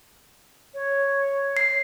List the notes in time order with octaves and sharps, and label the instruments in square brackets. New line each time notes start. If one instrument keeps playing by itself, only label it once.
[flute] C#5
[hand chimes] C7